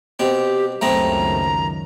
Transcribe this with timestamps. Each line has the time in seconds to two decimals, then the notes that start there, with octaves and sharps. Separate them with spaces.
0.19 B2 C4 G4
0.82 C#2 F#2 D#3 A3 B3 C4 A#5